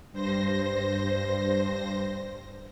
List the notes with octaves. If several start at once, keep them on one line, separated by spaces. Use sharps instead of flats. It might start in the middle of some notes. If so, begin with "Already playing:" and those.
G2 C5 A#6